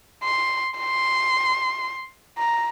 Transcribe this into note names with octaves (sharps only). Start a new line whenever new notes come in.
C6
C6
A#5